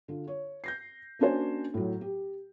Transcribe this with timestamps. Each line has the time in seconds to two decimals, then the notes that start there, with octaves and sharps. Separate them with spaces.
0.08 D3 F4
0.27 C#5
0.64 G6 A#6 C7
1.19 A#3 C#4 D4 F#4 C5 G#5
1.74 A2 F#3
2.01 G4